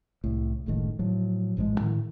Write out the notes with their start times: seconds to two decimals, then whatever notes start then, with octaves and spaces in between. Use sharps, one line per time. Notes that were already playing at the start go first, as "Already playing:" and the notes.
0.24 C2 A2
0.66 F#1 C#2 A2 D#3
0.99 A2 F3 F#3
1.57 A1 G#2 F3 G#3
1.80 A2 D#3